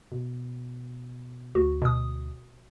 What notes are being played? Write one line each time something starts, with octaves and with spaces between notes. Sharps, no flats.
B2
D2 F#4
B2 D#6